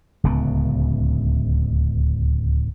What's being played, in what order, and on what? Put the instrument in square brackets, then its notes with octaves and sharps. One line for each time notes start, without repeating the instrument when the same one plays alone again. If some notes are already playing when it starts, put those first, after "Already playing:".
[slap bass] D1 C#2 C#3 B3